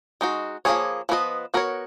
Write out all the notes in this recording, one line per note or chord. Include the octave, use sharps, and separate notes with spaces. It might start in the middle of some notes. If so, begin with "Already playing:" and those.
G#3 D#4 F#4
F3 A#3 C#4 G#4 C#5
F3 B3 F#4 B4 D#5
B3 F#4 A#4 C#5